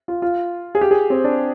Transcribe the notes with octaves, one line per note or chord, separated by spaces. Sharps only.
F4
F4
G#4
G4
G#4
C4
D4